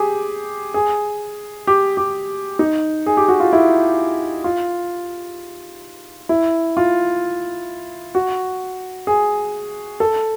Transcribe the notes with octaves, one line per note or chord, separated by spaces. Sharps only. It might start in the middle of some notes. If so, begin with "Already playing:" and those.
Already playing: G4 G#4
G#4
G4
G4
D#4
G#4
G4
F#4
F4
E4
F4
E4
F4
F#4
G#4
A4